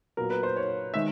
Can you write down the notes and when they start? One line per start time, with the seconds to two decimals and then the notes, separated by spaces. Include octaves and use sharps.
0.17 A#2 F#3 B3 A#4
0.30 B4
0.43 C5
0.56 C#5
0.94 D#3 G#3 E5